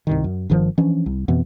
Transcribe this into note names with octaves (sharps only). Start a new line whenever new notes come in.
C2 G2 D#3
F#2
G1 G2 D#3 F3
E3 F3 C#4 D4
C2
F2 B2 E3 B3